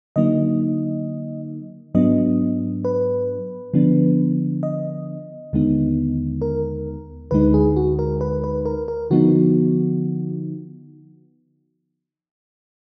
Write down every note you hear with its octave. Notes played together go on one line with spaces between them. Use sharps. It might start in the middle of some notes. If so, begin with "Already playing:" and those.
D3 F#3 A#3 D#4 D#5
G#2 F#3 B3 D4 D#5
B4
D3 F3 B3 D4
D#5
D#2 D3 G#3 B3 D#4
A#4
D2 D3 G#3 D#4 B4
G#4
F#4
A#4
B4
B4
A#4
A#4
D3 F3 B3 D#4 F#4